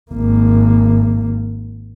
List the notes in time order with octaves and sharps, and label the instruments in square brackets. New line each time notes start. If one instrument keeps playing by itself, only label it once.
[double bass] G#1 A#3